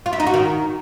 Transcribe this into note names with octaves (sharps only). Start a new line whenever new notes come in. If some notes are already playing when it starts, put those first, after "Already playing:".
F4
E4
D#4
F#4
D#3